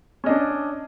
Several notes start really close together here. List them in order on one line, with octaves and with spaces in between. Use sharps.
C#4 D#5 D4